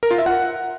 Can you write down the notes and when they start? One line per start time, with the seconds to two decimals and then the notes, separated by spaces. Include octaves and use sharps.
0.03 A#4
0.11 F4
0.18 E5
0.26 F#5